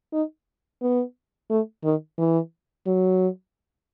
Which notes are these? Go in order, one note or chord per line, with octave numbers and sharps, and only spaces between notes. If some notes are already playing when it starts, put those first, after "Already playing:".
D#4
B3
A3
D#3
E3
F#3